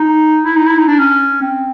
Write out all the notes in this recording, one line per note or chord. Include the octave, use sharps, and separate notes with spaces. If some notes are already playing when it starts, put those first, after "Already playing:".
Already playing: D#4
E4
D#4
E4
D#4
D4
C#4
C4